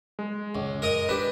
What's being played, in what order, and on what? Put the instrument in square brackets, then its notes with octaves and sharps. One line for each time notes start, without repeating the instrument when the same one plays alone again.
[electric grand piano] G#3
[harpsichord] C#2
A#4 D#5
[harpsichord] D4 [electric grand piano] G4 B4